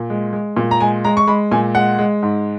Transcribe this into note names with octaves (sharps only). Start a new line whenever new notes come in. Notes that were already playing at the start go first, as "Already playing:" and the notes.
Already playing: A#2
G#3
G#3
A#2
A#5
G#3 G#5
G#3 A#5
C#6
G#3 B5
A#2 G#5
G#3 F#5
G#3
G#2